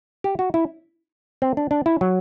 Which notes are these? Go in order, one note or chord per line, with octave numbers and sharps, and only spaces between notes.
G4
F#4
E4
C4
D4
D4
E4
F#3